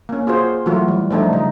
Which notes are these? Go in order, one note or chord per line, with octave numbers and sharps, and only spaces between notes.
A#3 C#4
F4 F#4 G#4 C5
E3 F#3 A3 F4 F#4
E3 G3
F3 G3 A3 D4 D#4
C#3 D#4